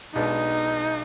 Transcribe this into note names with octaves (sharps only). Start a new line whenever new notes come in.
B1 B2 G#3 B3 D4 D#4